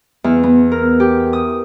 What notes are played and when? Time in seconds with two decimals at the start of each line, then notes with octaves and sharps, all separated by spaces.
0.24 E2
0.43 B3
0.72 A#4
1.00 G4
1.33 D#6